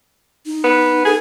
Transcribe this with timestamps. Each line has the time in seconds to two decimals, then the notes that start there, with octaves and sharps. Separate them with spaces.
0.46 D#4
0.64 B3
1.05 G#4 A4